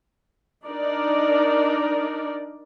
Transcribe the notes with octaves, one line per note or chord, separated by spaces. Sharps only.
D4 D#4 A#4 D5